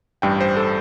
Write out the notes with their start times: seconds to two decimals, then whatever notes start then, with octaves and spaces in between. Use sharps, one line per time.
0.22 A1 G2 G3 G5
0.41 C5
0.57 A4